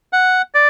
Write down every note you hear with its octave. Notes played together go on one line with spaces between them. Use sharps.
F#5
D5